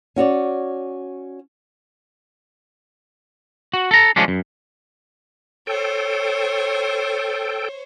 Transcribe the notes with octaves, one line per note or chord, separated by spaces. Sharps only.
C#4 F#4 C#5 D5
F#4
A4 A#5
F3 G#3 C#4 D4
F#2
A4 C5 C#5 G5